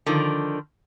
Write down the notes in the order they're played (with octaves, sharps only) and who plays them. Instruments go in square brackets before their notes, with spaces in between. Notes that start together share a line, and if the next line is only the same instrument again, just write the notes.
[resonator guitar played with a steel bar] D3 D#3 F3